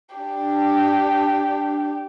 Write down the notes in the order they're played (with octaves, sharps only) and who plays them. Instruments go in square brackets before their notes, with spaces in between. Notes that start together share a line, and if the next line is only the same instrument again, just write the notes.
[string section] D4 [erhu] G4